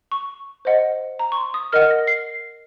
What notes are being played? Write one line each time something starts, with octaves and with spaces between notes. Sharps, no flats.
C#6
C5 D#5 F#5
A#5
C#6
C6
D#6
A#4 D#5 F#5 F6
A#6
C7